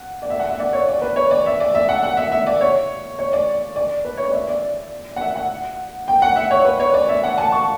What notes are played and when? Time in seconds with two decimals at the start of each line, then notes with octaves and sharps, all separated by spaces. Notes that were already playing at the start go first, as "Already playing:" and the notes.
Already playing: F#5
0.22 D5
0.30 E5
0.40 F#5
0.49 E5
0.59 D5
0.73 C#5
0.88 D5
1.02 B4
1.16 C#5
1.31 D5
1.46 E5
1.60 D5
1.75 E5
1.89 F#5
2.03 F#5
2.17 E5
2.32 E5
2.47 D5
2.61 C#5
3.19 C#5
3.33 D5
3.76 D5
4.05 B4
4.17 C#5
4.24 D5
4.34 E5
4.49 D5
5.16 F#5
5.21 E5
5.36 F#5
6.08 G5
6.22 F#5
6.36 E5
6.51 C#5
6.65 B4
6.80 C#5
6.94 D5
7.09 E5
7.24 F#5
7.38 A5
7.52 C#6